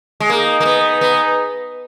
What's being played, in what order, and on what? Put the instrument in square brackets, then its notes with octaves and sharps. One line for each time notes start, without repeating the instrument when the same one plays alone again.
[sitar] G#3
[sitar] A#3 [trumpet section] D#4 G#4 D#5
[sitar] A#3
B3
B3